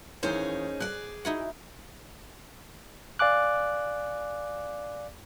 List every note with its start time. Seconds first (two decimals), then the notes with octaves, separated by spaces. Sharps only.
0.23 D#2 E3 C#4 D#4 G#4 C5 G6
0.80 G#4 D5 F#6
1.25 D#4 E4 F#4 F#5
3.19 D5 F5 G#5 D6 F#6